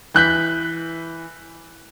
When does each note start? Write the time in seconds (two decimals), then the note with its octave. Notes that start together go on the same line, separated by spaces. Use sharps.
0.14 E3 F#6 G6 B6